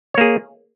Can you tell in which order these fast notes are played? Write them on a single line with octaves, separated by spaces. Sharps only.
C#5 A#3 G#4